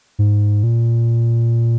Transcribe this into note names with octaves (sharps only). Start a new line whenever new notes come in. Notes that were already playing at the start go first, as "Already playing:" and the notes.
G#2
A#2